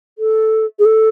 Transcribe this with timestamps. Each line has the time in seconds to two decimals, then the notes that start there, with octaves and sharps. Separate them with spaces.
0.19 A4
0.79 G#4
0.85 A4